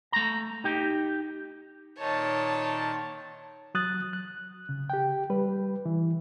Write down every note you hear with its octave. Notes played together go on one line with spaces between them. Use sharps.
A3 A#5
D#4 G4
A#2 D#3 D#4 C#5 A5
F#3 D#6 F#6 A6
F#6
C#3
G4 G5
G3 B4
E3